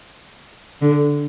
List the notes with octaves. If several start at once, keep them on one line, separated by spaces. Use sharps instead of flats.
D3